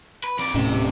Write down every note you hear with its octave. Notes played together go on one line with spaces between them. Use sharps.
B4
F2 D5
D#1 A2 C3 C#4